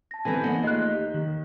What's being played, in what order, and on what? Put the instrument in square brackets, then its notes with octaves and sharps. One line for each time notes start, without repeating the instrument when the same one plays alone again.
[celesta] A5 A#6
[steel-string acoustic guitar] D3 C4 [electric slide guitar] E3 B4 G#5
[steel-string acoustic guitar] D#2 A#3 [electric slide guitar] B3 D#5 F#5
[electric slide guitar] A3 F4 G#4 [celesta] D#5 F#6
[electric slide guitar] G4
D#3